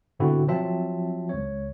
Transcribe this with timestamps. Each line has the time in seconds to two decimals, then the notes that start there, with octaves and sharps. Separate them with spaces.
0.19 G#2 B2 D3 C4 E4 F#4
0.48 F3 F#3 C4 F4 E5 A5
1.29 C#2 C#5